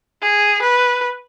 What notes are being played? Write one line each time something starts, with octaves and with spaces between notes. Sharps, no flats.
G#4
B4